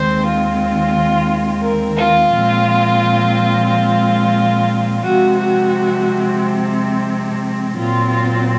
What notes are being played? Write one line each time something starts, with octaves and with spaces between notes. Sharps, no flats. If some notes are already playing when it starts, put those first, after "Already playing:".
Already playing: D#2 D#3 G#3 C4 C5
F4
A#4
F4
A#2 F3 G#3 C4
F4
C3 F3 G#3 C4 F#4
F#4
A#2 F#3 C4 F4
F4